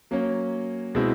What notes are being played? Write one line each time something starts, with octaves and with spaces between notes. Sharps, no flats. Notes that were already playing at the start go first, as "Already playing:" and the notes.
F#3 A#3 C#4
B2 G#3 C4 E4